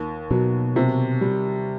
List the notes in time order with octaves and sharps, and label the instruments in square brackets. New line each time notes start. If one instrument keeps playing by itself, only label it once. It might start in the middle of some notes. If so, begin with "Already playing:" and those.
Already playing: [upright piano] D#2
[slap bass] B2 [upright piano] F#3
[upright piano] C3
G3